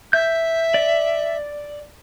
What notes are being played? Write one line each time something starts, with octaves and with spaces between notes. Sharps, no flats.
E5 G6
D5